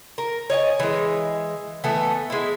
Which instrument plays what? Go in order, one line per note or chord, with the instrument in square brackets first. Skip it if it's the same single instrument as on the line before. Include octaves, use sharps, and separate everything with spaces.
[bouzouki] A#4
C#5 D#5 F5 G#5
E3 G#3
E3 A3 B3
G#3 E4